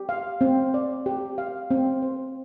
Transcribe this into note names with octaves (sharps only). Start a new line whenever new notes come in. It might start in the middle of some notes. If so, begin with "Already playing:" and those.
Already playing: G4
F5
C4
D5
G4
F5
C4
C5